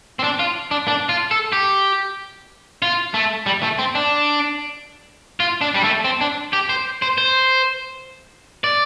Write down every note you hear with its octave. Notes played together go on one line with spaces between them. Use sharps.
C4
D4
F4
D4
D4
F4
A4
G4
F4
A3
G3
A3
C4
D4
F4
D4
G3
A3
C4
D4
G4
C5
C5
C5
D5